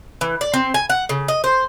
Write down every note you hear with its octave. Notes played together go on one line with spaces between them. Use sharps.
E3
D5
C4
G#5
F#5
C#3
D#5
C5